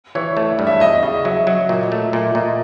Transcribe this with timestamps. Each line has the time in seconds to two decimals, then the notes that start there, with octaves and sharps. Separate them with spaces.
0.15 E3 C#5
0.37 A3 C#5
0.52 D5
0.59 G2
0.67 E5
0.80 E2 D#5
1.03 C#3 D#5
1.25 F#3 E5
1.47 F#3
1.69 A#2 D#5
1.92 A3
2.13 A#2 E5
2.35 A#2 D#5